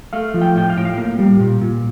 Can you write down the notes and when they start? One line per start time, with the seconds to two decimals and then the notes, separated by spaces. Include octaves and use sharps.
0.13 A3 F5
0.34 F3
0.41 G5
0.56 A2 G5
0.70 F5
0.77 A2 G5
0.85 F5
0.98 A#3
1.19 G3
1.40 A#2
1.61 A#2